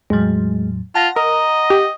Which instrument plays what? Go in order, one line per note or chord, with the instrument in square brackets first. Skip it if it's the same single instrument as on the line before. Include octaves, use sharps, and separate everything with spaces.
[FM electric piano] E2 A2 F#3 [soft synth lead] G#3
[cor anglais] F4 [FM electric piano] F#5 A#6 [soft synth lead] A5
[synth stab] A#4 [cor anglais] D#5 [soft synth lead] A#5
[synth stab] G4